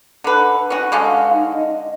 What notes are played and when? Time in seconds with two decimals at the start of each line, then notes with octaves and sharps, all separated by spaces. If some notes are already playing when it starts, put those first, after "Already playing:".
0.24 D3 B4
0.70 C#4 F#4
0.92 D3 G#3 C#4 F5
1.33 D#4
1.54 D#5